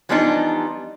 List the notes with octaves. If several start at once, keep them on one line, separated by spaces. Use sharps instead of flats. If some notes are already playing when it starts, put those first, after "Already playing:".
E3 F3 G3 B3 D4 D#4